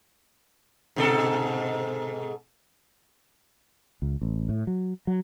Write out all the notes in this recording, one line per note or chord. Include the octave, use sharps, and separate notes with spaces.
G#2 B2 A4
C#2
A1
A2
F#3
F#3